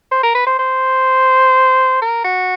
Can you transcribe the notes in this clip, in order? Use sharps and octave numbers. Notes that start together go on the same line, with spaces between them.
C5
A#4
B4
C5
C5
A#4
F#4